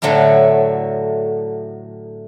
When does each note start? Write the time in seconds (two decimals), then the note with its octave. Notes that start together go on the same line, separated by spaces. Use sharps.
0.02 A2 D3 F#3 A3 E4